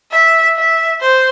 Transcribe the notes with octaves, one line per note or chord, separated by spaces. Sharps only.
E5
E5
C5